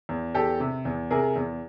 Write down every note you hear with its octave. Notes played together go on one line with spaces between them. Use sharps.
E2
E2 G4 A4
C3
E2
C3 G#4 A#4
E2